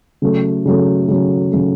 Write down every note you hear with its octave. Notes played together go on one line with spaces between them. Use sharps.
C#3 F#3 A3
C#3 F#3 A3
C#3 F#3 A3
C#3 F#3 A3